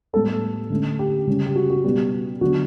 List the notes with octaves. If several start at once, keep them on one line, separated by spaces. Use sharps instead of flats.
A2 G3 B3 A4
D3 A3 C#4
G4
C#3 G3 C#4
G4
F#4
F#4
B2 G3 B3 G4
D3 F#3 B3 D4 F#4